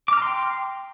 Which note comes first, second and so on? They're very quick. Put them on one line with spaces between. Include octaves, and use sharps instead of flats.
D6 F6 A#5 C6 G5